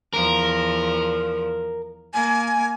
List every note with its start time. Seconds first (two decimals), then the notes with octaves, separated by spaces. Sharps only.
0.14 E2 F3 A#4
2.14 A#3 G#5